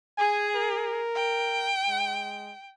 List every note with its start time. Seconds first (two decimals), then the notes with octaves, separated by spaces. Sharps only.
0.18 G#4 G#5
0.56 A#4
1.15 G5
1.88 G#3